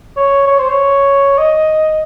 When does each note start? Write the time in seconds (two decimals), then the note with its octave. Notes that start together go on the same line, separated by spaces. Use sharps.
0.17 C#5
0.47 C#5
0.59 C5
0.70 C#5
1.38 D#5